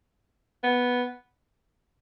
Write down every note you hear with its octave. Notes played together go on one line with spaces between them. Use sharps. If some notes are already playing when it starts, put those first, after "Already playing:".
B3